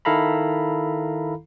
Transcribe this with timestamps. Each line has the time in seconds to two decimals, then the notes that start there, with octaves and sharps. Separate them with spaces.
0.05 D#3 E4 A4 F5 A#5 B5